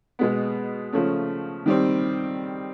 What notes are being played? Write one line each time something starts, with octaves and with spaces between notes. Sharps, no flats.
B2 G#3 B3
C#3 F3 A3 C#4
D#3 G3 C4